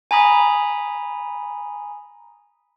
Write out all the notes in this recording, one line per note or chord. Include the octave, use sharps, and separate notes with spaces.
G#5 A#5 B5 D#6